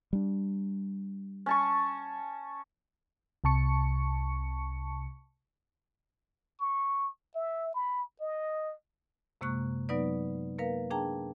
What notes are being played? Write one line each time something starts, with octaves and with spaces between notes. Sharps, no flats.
G3 D4
C#4 A5 C#6
C2 C3 A5 C#6 C#7
C#6
E5
B5
D#5
F#2 C3 G#3 A#3 C#6 F#6
F#3 B3 D#4 B4 D5
A#3 A#4 B4 F5
D4 G#4 G5 A5 A#5